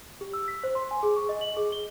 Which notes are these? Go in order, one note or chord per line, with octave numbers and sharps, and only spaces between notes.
G4
E6
B6
C5
C6
G#5
G#4
C#6
D#5
F#7
G#4
G7